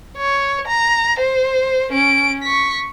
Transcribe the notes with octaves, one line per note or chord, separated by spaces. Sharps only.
C#5
A#5
C5
C#4 D7
C#6 B6